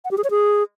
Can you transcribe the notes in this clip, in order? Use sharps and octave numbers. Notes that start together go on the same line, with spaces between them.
F#5
G4
G#4
C#5
G#4